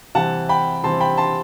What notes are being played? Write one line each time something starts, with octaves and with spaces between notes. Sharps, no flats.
C3 E3 G3 C4 F#5 A5
G5 B5
C3 E3 G3 C4 A5 C6
G5 B5
A5 C6